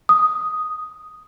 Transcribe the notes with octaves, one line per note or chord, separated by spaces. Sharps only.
D#6